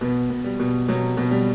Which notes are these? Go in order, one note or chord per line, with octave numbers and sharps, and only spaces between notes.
B2 B3
B2
G3
B2
B2 F#3
B2
G3